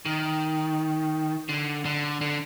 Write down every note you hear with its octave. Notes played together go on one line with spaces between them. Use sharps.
D#3
D3
D3
D3